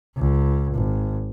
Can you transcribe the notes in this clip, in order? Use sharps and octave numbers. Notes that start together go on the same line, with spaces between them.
C#2
G#1